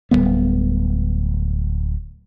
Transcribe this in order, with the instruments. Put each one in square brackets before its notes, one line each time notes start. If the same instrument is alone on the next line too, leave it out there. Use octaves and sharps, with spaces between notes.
[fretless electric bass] D1 F2 G3 B3